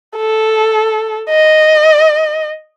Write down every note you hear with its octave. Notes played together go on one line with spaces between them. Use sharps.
A4
D#5